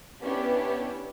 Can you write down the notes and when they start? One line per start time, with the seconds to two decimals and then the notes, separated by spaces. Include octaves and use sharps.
0.20 B3 C#4 D4 E4 G4 B4